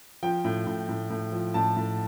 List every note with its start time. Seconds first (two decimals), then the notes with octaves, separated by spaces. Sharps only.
0.23 F3 G5
0.44 A2
0.67 A2
0.89 A2
1.10 A2
1.32 F3
1.54 A2 A5
1.77 A2